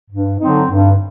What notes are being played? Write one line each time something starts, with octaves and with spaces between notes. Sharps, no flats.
G2
D3 F#3 C4 D#4
G2